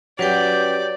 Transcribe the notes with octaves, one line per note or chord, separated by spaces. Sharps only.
F#3 C#4 G4 B4 D5 G5